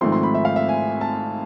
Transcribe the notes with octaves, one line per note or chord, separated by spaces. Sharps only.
G#1 G#2 F3 A3 C4 C6
C6
B5
E5
F5
E5
G#5
A5